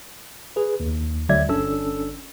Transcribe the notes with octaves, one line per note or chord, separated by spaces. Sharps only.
G#4 B4
D#2
D2 D3 F#3 D5 E5 G#6
G1 C#4 D4 A4 E6